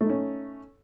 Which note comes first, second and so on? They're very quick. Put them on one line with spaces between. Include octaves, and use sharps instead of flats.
A3 D#4 C#4